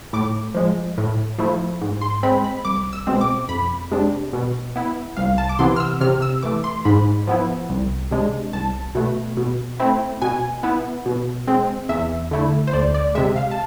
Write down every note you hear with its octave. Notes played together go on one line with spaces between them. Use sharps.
A2 D6
F3 G#3
A2
F3 A3 E4
G#2
C6
G#3 C4 B5
B5
C2 D6
E6
B2 G#3 C4
D6
F2 B5
C3 G#3 D4
B2
B3 E4
C2 F5
A5
D6
C3 E3 B3 E4 C6
F6
E6
C3 F6
E6
E3 A3 D6
C6
G#2 B5
F3 B3 E4
C2
C3 G#3 D4
C2 A5
B2 A3
B2
A3 C4 E4
B2 G#5
B3 E4
B2
G#3 C4
E2 E5
D3 A3 E4
C5
D2 D5
D5
C3 G#3 E5
F5
A5